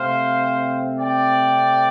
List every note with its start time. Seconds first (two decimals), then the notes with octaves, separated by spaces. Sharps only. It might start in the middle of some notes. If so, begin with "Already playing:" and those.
Already playing: C3 A3 C4 C5 F5
0.99 D5 G5